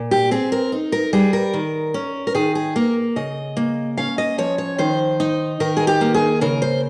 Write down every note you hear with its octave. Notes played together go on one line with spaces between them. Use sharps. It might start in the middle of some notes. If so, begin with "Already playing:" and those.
Already playing: A#2
G4
C4 G#4
A#4
D#4
A#4
G3 G#4
A#4
D#3
C#4
A#4
D#3 G#4
G#4
A#3 A#4
C#3 D#5
A#3
C#4 F5
D#5
F3 C#5
C#5
D#3 C5
D#4
D#3 A#4
G#4
G4
A#3
G#4
C#3 A#4
C5